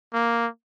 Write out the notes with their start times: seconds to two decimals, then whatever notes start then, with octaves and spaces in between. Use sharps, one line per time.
0.14 A#3